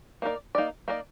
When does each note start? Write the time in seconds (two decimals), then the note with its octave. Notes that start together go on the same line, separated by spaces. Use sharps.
0.22 A#3 D#4 A#4 D5
0.55 A#3 D#4 A#4 D5
0.88 A#3 D#4 A#4 D5